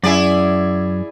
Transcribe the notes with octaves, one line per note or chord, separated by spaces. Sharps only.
F#2 E4 G#4 D5